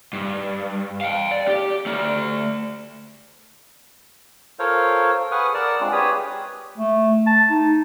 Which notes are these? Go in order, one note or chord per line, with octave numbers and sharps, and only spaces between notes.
G2
F5 G5
D5
G4
A3 D5
F4 A4 A#4 C5 C#5 F5
G#4 B4 F#5 C#6 D#6 F6
A#4 D5 F#5 A5
G#3 C4 D4 F4
G4 G#4 B4 C#5 B5 D#6
A3
A5
D#4